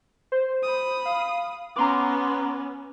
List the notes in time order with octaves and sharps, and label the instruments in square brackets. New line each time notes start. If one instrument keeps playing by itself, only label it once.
[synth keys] C5
[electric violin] B5 D#6
[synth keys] F5
[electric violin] B3 C#4 [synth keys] A#5 C6 D6